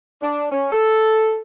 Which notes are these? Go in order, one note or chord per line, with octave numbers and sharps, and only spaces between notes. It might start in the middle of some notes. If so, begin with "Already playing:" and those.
D4
C#4
A4